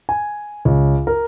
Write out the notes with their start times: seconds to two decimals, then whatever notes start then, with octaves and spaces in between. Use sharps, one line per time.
0.09 G#5
0.65 C#2
1.07 A#4